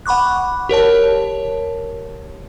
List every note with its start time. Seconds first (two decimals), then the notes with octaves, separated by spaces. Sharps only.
0.06 F#5 B5 C#6 D6 F#6
0.69 G4 A#4 C#5 A5